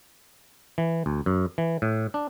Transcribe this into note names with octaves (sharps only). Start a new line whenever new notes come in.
E3
D2
F#2
E3
A2
D4